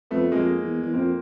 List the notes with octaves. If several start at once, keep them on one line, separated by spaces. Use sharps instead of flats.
F2 A3 B3
F2 G#3 A#3
E2
E2
F2 A#3 C4